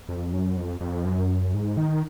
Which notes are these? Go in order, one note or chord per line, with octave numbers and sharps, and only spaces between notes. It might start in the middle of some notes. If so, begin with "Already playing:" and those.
F2
F#2
F2
F2
F#2
G#2
D#3